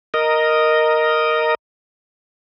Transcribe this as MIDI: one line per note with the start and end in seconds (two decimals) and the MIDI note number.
0.14 1.55 70
0.14 1.55 75